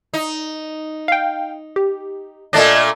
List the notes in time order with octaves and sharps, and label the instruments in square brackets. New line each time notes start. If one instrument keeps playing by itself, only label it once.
[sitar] D#4
[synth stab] F5 G5
G4
[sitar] A#2 A3 D4 [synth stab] D5 D#5